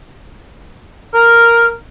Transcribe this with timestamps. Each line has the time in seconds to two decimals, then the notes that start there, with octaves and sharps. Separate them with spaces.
1.14 A#4 F6